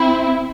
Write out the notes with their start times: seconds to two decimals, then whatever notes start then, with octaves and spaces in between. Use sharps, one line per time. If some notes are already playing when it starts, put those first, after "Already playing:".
Already playing: C4 E4